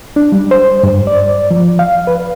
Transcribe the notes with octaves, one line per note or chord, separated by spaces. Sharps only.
D4
G3
C5
G2
D5
F3
F5
B4